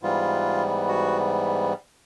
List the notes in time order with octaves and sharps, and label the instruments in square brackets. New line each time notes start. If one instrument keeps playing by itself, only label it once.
[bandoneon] G#2 E3 G3 B3 F4
F#4